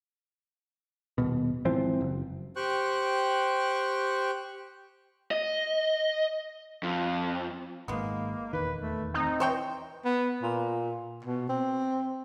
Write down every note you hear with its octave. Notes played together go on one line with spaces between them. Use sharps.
D#1 B2
G#1 E3 F3 C4
F#1
G4 C5 G5 C#6 F#6
D#5
F2
G#1 G#2 G#3 A#3 B3
D#1 E2 D#3 B4
A3
C4 D#4
E3 C5 C#5 G5
B3
A#2
B2
C4